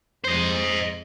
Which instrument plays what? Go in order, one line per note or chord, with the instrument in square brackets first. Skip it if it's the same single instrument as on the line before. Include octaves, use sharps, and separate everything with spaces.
[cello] F2 G#3 [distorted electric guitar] C5 D#5